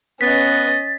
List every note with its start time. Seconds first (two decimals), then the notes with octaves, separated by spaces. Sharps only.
0.21 B3 C#4 D#5 A6 B6